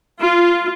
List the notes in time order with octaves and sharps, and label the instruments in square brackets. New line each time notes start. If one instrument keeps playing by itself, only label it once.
[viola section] F4